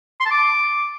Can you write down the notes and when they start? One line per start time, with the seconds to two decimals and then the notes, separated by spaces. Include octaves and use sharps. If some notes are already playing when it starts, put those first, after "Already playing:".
0.20 C6
0.26 A5
0.31 D6